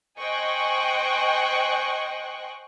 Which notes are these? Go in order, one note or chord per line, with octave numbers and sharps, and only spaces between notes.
C5 D#5 G5 G#5 C#6 F#6